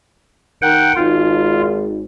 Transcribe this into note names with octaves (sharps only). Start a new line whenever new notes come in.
D#3 A#4 F#5 G5
G#1 F4